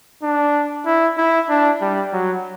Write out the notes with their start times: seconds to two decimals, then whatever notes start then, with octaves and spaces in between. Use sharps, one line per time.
0.23 D4
0.86 E4
1.18 E4
1.49 D4
1.81 G3
2.13 F#3